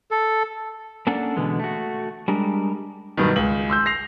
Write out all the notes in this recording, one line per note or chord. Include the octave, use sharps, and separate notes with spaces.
A4
A#3 C#4 D4 A4 D5 F#5
B2 D3 E3 G#3 B3
A3 F#4
G3 G#3 D4 A#4
G2 B2 D#3
C#2 F#7
C6 E6 G6
A#6 C7 F7